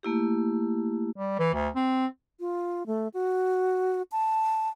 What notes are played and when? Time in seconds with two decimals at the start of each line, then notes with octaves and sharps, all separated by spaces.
0.03 A3 A#3 E4 G4
1.16 G3
1.39 E3
1.53 D2
1.75 C4
2.40 F4
2.87 A3
3.14 F#4
4.12 A5